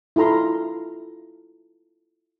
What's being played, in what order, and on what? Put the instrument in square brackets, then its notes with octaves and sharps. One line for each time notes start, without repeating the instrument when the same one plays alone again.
[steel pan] E4 F4 A4 A#5 C6